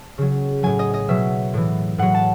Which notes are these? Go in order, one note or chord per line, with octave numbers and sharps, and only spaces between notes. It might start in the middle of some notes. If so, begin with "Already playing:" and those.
Already playing: A5
C#3 F#3
A2 F#3 G#5
D#5
D#5
B2 F#3 E5
A2 E3
A2 F#3 F#5
A5